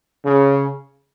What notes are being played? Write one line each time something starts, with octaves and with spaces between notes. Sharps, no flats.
C#3